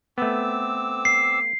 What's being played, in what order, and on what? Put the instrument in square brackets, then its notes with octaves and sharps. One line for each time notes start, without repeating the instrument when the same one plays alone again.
[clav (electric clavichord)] A3 B3 [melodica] C4 D6 E6
[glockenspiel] C7